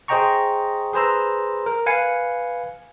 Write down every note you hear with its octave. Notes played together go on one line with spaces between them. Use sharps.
G#4 C5 D#5 G5 A#5 C#6
G#4 B4 C5 A#5 E6
A#4
B4 F5 G#5 C#7